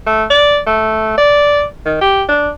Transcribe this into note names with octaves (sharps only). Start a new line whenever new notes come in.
A3
D5
A3
D5
D#3
G4
D4